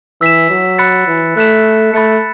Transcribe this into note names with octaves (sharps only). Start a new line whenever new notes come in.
E3 E6 B6 E7
F#3
B5 F#6 A6 C#7
E3
A3 B5 F#6 B6 E7
A3 B5 A6 C#7